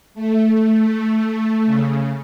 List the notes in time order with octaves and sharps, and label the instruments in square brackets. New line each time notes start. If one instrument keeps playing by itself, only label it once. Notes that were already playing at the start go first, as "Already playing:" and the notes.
[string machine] A3
C#3